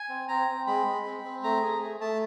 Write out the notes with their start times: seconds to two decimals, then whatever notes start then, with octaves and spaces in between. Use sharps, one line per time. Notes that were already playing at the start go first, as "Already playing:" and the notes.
Already playing: G#5
0.09 C4
0.28 C4 A#5
0.48 C4
0.67 G#3 B5
0.86 G#3
1.05 C4
1.24 C4
1.44 A3 A#5
1.62 G#4
1.81 A3
2.00 A3 A5